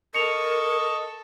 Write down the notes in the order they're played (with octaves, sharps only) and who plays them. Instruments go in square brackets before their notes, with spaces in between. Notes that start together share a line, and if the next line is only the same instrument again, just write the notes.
[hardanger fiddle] A4 [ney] A#4 [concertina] D#5 C#6 [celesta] C#7 F7